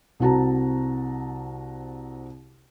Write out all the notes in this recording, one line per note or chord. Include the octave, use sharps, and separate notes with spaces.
C2 C4 F#4 A5 A#5